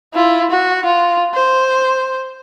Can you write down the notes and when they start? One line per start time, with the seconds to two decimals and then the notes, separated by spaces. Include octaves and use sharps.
0.14 E4 F4
0.50 F#4
0.85 F4
1.34 C5